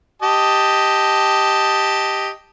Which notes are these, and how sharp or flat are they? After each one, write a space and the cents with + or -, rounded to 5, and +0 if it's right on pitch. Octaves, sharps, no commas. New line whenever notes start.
G4 +0 D#5 +0 A5 +0